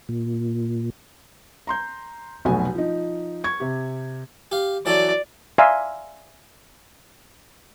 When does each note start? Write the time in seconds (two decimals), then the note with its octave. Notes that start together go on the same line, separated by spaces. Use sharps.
0.09 A#2
1.67 A#5 C6 G6
2.45 F1 B1 B2 A3 F#4 G#5
2.75 F3 D#4
3.44 C#6 G#6
3.60 C3 G4
4.52 G4 F5
4.86 E3 F#3 A4 D5
5.58 D5 E5 F5 G#5 A#5 C6